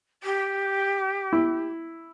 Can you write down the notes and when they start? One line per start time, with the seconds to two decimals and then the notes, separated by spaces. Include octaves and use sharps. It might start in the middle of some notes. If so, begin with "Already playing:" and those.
0.23 G4
1.33 E4